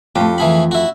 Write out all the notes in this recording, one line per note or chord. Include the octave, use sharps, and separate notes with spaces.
F2 A3 G4
E3 G#4 B5
E4 F#4